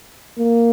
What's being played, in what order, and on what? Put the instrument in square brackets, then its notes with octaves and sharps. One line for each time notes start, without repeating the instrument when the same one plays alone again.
[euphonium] A#3